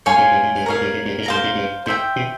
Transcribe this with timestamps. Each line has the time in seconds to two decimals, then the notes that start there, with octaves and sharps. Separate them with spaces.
0.06 G2 C#5 F5 G#5 C6
0.18 G#2
0.31 G2
0.43 G#2
0.55 G2
0.66 G#2 A#4 C#5 F5
0.81 G2
0.94 G#2
1.05 G2
1.18 G#2
1.26 G2 C5 F5 A#5
1.44 G#2
1.55 G2
1.86 G#2 C5 E5 G5
2.16 B2